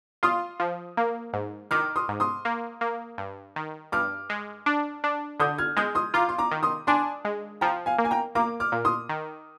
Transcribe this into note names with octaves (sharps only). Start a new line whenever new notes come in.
F4 C6 D#6
F3
A#3
G#2
D#3 D6 F6
C6 D#6
G#2
C6 D#6
A#3
A#3
G2
D#3
G2 D6 F6
G#3
D4
D4
D3 D#6 G6
F6 G#6
G#3 D#6 G6
C6 D#6
F4 A#5 D6
C6
A#5 D6
D#3
C6 D#6
D4 G#5 C6
G#3
F3 G5 A#5
F5 G#5
A#3
G#5
G5 A#5
A#3 A#5 D6
D6 F6
A#2
C6 D#6
D#3